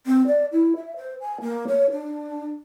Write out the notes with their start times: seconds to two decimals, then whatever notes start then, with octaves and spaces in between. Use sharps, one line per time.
0.07 C4
0.27 D5
0.52 E4
0.76 E5
0.96 C5
1.21 G#5
1.41 A#3
1.67 C#5
1.91 D4